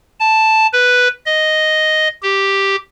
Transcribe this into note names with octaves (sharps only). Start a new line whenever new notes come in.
A5
B4
D#5
G4